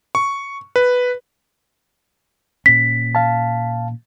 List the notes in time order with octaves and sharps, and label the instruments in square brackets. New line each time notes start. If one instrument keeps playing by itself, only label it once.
[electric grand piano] C#6
B4
[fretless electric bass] A#2 C#4 [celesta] B6
[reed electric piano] F5 A5